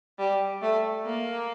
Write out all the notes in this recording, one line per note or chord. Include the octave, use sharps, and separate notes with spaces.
G3
A3
A#3